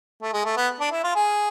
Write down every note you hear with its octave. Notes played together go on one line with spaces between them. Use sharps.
A3
G#3
A3
B3
D4
E4
F4
G#4